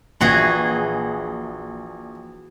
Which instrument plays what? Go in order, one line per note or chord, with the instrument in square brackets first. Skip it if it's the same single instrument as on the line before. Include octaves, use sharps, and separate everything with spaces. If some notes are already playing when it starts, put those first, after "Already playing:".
[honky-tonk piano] A#1 [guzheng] E3 F#4 G#4